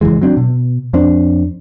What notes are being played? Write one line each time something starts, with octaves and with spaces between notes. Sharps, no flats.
F#1 D#2 E3 G#3
F#3 C4 D4
B2
F2 C4 D4